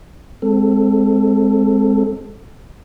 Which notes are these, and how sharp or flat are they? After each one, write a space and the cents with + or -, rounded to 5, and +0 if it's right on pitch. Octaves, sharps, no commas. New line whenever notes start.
G#3 -10 C4 +0 A4 +10